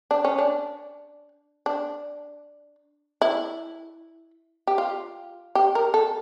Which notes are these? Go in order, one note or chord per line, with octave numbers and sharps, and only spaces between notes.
D4
C#4
D4
D4
E4
G4
F4
G4
A#4
A4